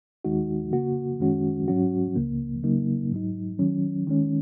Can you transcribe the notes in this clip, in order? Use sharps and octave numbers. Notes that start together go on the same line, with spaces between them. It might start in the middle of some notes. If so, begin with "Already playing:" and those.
D#2 D#3 G#3 D#4 F#4
C#3 A#3 F#4
F#2 D#3 G#3 C#4 F#4
G#2 F#3 C#4 F#4
C#2 C#3 A#3
C#3 F#3 A#3 D#4
G#2 F#3 D#4
D#3 F#3 C#4
D#3 G#3 C#4